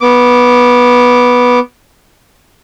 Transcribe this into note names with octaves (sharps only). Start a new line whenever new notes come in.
B3 D6